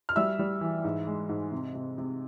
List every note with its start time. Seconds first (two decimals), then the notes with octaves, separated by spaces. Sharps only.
0.09 F6
0.16 G3 E5 E6
0.39 G3
0.61 E3
0.84 G#2
1.07 G#3
1.29 G#2
1.52 C3
1.75 C3
1.98 C3